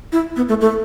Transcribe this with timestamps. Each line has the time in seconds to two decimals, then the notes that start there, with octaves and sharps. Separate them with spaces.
0.12 E4
0.36 B3
0.49 A3
0.61 A3